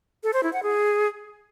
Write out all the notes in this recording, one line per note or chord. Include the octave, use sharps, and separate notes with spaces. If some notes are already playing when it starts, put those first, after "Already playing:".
A4
C5
E4
F#5
G#4